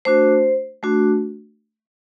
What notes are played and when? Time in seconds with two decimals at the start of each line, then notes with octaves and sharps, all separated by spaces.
0.05 A3 D4 F#4 C5
0.83 A3 D4 F#4